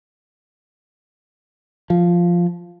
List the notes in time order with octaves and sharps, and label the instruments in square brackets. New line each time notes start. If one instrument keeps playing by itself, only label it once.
[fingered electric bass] F3